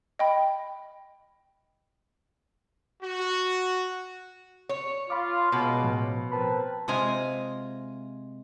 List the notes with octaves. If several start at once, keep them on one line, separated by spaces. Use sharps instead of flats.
D#5 G5 B5
F#4
C#5
F4 B5 D6
C#2 B2
A2 F3
C4 A#4 B4 A5 B5
C3 G#3 F4 G#5 A#5